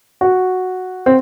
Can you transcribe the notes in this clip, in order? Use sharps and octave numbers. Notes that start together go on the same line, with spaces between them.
F#4
C4